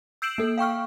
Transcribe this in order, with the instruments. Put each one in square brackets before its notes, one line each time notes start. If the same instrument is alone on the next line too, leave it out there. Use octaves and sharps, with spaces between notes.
[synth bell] E6 G6 C7 D7 E7 F#7
A#3 A4
F5 G5 C#6 F6